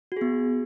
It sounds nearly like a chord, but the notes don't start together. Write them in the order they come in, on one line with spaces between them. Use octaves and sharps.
F#4 G#4 B3